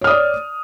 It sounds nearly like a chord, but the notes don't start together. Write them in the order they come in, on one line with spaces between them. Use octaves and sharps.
C#5 F6 D#6 D5